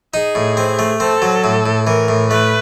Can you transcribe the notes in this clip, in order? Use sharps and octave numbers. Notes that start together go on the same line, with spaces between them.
D#4 G#4
A2
C4
A3
C4 A4
F#3
A2
A2
E3 A#4
A2
A3 B4